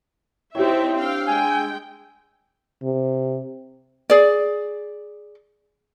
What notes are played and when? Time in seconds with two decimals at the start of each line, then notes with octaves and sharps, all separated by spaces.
0.55 C4 D#4 E4 G4 C#5 E5 G5
0.98 D4 F5 G5 E6
1.27 G#3 G5 G#5
2.83 C3
4.10 G#4 D5